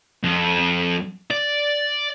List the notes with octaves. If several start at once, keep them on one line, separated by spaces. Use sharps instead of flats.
F2
D5